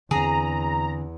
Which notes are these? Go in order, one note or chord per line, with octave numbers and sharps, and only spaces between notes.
E2 D3 C4 G#4 A#5